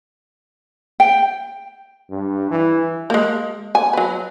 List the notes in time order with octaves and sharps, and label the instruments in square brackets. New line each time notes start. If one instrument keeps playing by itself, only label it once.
[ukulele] G5
[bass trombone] G2
E3
[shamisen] G#3 A#3
G#5
F#3 B4